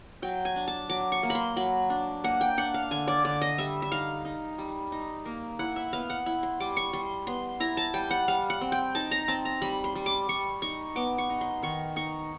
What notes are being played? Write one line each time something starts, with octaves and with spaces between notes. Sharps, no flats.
F#3 G5
G#5
D4
A5
F#3 D6
C#6
A#3
B5 C6
F#3 B5
D4
A#3 F#5
G5
D4 F#5
F5
D3 G#5
D5
D3 D5
D#5
G3 E5
E5
D#4 F5
D#4
G3
D#4
A#3
E4 F#5
E5
B3 F5
F#5
E4 B5
C6
G3 D6
C#6
G3 C6
B3 C6
E4 A#5
A5
G3 G5
F#5
G3 F5
F#5
C4
G5
D#4 A5
A#5
C4 A5
A#5
G3 B5
C6
G3
D6
G3 C#6
D#4 C#6
B3 D6
C#6
D#4
C6
D#3 C#6
D#4 C#6